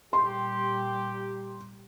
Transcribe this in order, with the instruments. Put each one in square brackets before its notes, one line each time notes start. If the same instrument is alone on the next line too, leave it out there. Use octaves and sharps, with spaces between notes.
[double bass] A#2 G3 [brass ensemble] G4 [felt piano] C6